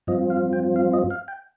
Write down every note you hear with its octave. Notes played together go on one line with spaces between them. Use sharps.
G2 F3 C4 F4 D#5
F5
G5
F5
D#5
F5
G5